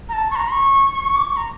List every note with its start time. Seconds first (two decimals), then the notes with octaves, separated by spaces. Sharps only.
0.09 A#5
0.13 A5
0.31 C#6
0.36 A#5
0.52 C#6
1.16 D6
1.26 C#6
1.37 A#5